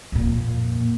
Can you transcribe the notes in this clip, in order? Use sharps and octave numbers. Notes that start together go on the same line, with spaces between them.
F2 A#2